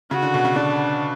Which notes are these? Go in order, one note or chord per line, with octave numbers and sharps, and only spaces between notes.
C#3 F#4
D3
B2
C#3
D3 D4